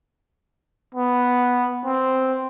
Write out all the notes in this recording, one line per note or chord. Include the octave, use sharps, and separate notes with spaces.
B3
C4